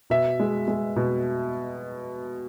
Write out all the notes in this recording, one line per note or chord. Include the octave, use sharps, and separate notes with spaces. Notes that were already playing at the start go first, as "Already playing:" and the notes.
B2 E5
G#3
G#3
B2